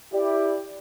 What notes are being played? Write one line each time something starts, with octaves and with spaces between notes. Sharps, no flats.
E4 G4 D5